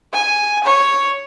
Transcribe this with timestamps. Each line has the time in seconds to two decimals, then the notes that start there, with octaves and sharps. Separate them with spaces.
0.13 G#5
0.64 C#5